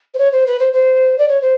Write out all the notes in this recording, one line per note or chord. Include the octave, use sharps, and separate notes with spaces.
C5
C#5
C5
B4
C5
C5
D5
C#5
C5